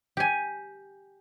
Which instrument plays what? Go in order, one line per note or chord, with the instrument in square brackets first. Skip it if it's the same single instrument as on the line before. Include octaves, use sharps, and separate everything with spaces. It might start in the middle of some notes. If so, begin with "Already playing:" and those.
[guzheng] G4 G#5